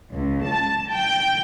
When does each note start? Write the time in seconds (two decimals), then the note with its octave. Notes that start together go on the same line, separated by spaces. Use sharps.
0.13 C#2
0.45 A5
0.91 G5